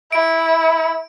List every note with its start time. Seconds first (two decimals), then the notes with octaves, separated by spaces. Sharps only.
0.12 E4 D7